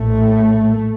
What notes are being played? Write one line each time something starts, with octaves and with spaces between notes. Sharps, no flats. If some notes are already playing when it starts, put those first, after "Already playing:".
Already playing: A#1 A2 A3